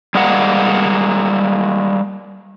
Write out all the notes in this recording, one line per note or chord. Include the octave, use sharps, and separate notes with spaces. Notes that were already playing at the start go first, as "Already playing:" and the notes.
G3 G#3 A#3 F#5